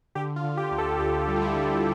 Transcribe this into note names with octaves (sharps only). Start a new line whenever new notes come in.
D3 G4
F4
D3
G4
D2
A4
D2 G4
G3
F4
E4
D3